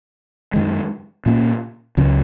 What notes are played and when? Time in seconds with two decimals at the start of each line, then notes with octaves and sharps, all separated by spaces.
0.54 F#2 D#3 G#3
1.26 A#2 A#3 C#4
1.97 C#2 C#3 F#3 C#4